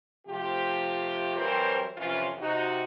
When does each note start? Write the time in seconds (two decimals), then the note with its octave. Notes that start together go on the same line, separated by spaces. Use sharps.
0.27 C3 F3 A3 F4 G4
1.36 E3 F#3 G3 C4 A#4 C5
1.96 F2 C3 E3 F3 C#4 F4
2.39 C3 D#4 F#4